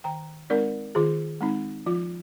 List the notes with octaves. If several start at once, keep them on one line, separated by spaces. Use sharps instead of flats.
D#3 G5 A#5
G#3 C4 D#4 A#4 D5
D#3 F4 G#4
G#3 C4 D#4
F3 F4